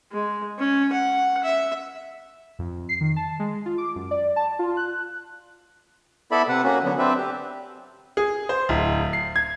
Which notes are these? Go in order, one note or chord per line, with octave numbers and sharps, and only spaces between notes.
G#3
C#4
F#5
E5
F2
C7
D#3
A5
G#3
F4
D6
F#2
D5
A5
F4
F#6
B3 E4 A4 D5 E5 B5
C3 B4 F#5
A#3 C#4 F#4
D3 F#3 B3
C4 D4 B4 E5
G4
G#4
C5
D1
C7
G#6